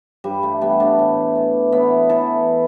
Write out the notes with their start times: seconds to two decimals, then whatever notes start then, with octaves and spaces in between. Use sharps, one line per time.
0.24 G2 G3
0.43 A3
0.61 E3 G3 B3
0.80 A3 D4
0.99 A2
1.35 E3
1.72 A2 B3 E4
2.09 E3 E4 A4